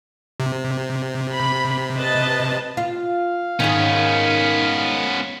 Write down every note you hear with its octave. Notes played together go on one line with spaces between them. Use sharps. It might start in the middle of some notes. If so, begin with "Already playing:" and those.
C3
B5
B4 D#5 A5
F4 F5
G#2 D#3 B3 C#4